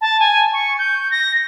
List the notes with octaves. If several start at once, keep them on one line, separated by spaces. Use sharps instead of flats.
A5
G#5
C#6
G6
A#6